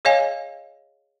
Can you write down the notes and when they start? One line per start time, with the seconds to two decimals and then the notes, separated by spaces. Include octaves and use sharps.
0.05 G#4 C#5 D#5 F5 G#5